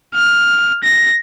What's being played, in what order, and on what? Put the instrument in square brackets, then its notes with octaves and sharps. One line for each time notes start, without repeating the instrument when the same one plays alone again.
[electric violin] F6
A#6